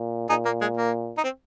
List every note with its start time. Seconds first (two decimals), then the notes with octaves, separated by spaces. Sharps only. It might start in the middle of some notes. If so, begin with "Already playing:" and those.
Already playing: A#2
0.29 A#2 D#4 G#4
0.45 A#3
0.61 G#3
0.77 A#3
1.17 D#4
1.24 C4